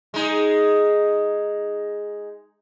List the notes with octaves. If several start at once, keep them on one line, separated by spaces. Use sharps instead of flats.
G#3 D#4 G#4